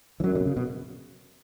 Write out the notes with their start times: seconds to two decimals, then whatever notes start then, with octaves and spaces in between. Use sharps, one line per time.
0.20 E3
0.24 F#2 F#3
0.35 D3
0.40 B2
0.46 C#3
0.57 B2